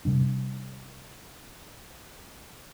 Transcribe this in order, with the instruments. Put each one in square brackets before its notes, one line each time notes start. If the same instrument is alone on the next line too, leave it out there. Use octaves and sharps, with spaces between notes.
[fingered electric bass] C3 G3 D4